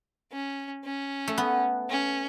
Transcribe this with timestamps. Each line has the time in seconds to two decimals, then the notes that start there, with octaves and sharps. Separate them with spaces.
0.32 C#4
0.85 C#4
1.28 A3
1.38 B3
1.90 C#4